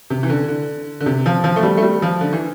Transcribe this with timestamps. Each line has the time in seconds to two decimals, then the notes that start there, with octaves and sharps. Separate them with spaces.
0.10 C3
0.23 E3
0.30 D3
0.48 D3
1.00 D3
1.06 C3
1.26 F3
1.44 F3
1.56 A3
1.63 G3
1.77 A3
1.82 G3
2.02 F3
2.21 D3
2.33 E3